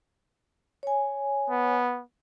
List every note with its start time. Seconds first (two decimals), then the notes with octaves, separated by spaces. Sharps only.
0.83 C#5 G#5
1.50 B3